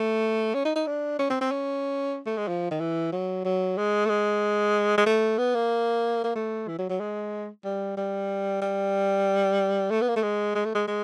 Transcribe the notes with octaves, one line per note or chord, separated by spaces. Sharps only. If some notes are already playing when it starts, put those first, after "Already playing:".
Already playing: A3
C#4
D#4
D#4
D4
C#4
C4
C4
C#4
A3
G#3
F3
D#3
E3
F#3
F#3
G#3
A3
G#3
G#3
A3
B3
A#3
A#3
A3
E3
F#3
F#3
G#3
G3
G3
G3
A3
B3
A#3
A3
G#3
G#3
A3
G#3
G#3